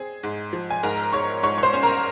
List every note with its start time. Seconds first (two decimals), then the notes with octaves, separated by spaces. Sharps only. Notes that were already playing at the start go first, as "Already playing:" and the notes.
Already playing: C4 G#4
0.23 G#2
0.53 F3
0.70 G#5
0.83 G#2 A#4 A#5
1.12 G#2 C#5 C#6
1.43 G#2 C#5 C#6
1.58 C#6
1.63 C5 C6
1.73 C#4
1.83 A#4 A#5